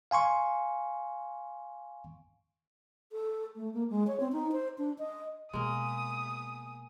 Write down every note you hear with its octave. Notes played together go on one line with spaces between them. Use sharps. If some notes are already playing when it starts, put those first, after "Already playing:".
F5 G#5 C6 C#6
A4
A3
A#3
G#3
C#5
C4
D#4
C5
D4
D#5
B2 G#3 A#3 G#5 D#6